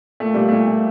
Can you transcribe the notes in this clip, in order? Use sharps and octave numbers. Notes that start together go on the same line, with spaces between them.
A#2 A3
A#2 G3
A#2 A3
A#2